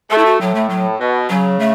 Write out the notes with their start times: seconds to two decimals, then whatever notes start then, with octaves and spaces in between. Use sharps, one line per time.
0.10 A3 A4
0.18 E4
0.25 F#4
0.40 A2 F#3
0.55 A3
0.69 F#3
0.99 B2
1.29 C#3 F#3
1.59 A3